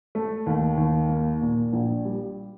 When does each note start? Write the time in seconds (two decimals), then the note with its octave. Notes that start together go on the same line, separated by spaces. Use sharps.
0.15 A3
0.46 D#2
0.77 D#2
1.09 A#3
1.41 A#2
1.73 A#1
2.05 G3